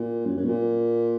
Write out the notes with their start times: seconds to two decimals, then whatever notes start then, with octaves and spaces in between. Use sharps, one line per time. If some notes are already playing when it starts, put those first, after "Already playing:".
Already playing: A#2
0.26 F#2
0.37 F#2
0.45 B2
0.49 A#2